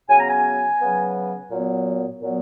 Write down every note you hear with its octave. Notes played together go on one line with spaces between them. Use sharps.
C#3 F#3 B3 G#5
A#5
G#5
C#3 F#3 B3
A#2 F#3 B3
A#2 F#3 B3